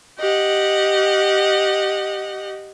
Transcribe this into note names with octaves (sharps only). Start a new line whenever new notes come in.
G4 D#5 F#5